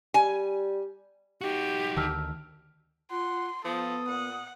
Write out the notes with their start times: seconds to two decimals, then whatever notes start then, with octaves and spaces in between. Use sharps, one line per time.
0.14 G3 G#5
1.41 D#4 F#4 G4
1.97 D2 D#3 A5 E6 F6
3.11 F4 F#5 C6
3.65 F3 B3 A4 D#6
4.08 A#2 F#5